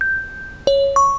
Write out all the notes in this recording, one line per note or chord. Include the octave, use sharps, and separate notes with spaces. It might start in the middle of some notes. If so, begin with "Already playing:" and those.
G6
C#5
C#6